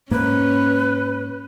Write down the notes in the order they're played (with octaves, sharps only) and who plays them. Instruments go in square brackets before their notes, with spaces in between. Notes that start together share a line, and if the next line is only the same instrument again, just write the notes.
[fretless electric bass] G#2 A#3 [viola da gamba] C#4 [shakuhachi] B4